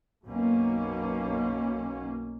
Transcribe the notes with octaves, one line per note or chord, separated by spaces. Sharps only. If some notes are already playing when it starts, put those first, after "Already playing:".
B1 F#2 B2 A#3 C#4